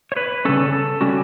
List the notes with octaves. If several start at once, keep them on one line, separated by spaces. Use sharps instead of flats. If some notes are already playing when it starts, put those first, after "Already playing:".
C#5
B4
C#3 G3 C#4 A4
A4
C#3 G3 C#4 F#4